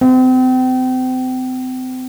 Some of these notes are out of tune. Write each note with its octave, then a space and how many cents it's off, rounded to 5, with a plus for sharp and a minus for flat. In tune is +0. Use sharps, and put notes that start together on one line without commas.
C4 -35